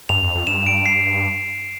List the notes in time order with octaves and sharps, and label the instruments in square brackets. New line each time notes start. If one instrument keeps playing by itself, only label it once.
[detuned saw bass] G2 [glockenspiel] F7
[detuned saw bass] F2
F2
[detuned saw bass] G2 [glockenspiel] E7
[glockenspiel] D7
C7